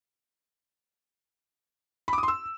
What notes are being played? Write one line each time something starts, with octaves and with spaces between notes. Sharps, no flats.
B5
D6
D#6
C6
E6